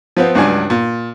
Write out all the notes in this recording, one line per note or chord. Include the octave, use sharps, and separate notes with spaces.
F3 B3 C4
C#2 G2 F#3 D4 G#5
A#2